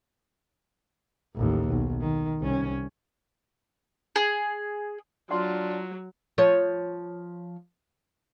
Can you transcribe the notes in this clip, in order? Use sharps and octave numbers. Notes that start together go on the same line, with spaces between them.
A1 D#2
B1
D#3
C2 C#4
G#4
F#3 D4 F4 F#5 C6
F3 C#5